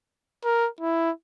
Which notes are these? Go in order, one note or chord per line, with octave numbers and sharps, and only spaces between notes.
A#4
E4